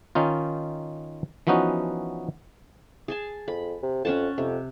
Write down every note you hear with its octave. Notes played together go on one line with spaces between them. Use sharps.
D#3 C#4 D#4 F4
E3 F3 B3 C#4 D#4 F#4
G#4 G#5 A5
F2 B5
C3
F2 C#4 F#5 A5
F2 C3